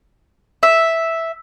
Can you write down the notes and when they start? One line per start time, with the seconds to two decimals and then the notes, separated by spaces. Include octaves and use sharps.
0.63 E5